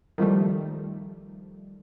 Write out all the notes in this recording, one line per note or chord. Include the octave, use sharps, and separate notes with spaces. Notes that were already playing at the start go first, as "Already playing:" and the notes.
D#3 F3 G3 A3